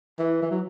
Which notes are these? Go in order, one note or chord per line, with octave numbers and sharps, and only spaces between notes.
E3
E3
F#3